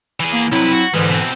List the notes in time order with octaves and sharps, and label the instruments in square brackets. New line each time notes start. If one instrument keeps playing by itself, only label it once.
[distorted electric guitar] E3 G#4
[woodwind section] A#3
[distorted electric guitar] C2 B4 [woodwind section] F#3 C4 E4
[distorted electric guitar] F#4
[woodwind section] G#2 D3 E3 [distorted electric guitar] G3 G#3
[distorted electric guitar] B2 C4